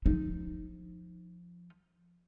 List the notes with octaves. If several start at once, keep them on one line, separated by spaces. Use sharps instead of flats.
F3 D#4